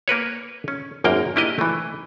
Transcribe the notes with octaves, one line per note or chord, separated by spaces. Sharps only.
A#3 A#4 B4 C#5
C#4
G#1 F#2 A#3 G5 A#5
A#3 D4 E4 G4 A#4 D#5
E3 A3